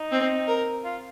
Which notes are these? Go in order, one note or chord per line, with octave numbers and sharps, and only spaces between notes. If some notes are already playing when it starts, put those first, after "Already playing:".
Already playing: D#4
C4
A#4
F4